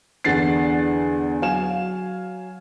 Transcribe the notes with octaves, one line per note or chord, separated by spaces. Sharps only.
E2 D3 F#5 A6 C7
F#3 F5 G#5 E7